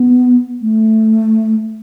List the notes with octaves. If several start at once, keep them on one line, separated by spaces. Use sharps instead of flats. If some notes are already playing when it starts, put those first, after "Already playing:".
Already playing: B3
A3